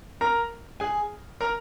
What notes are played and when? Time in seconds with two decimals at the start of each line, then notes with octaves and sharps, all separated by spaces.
0.21 A#4 A#5
0.80 G#4 G#5
1.41 A#4 A#5